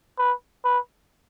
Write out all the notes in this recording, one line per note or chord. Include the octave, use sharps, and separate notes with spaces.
B4
B4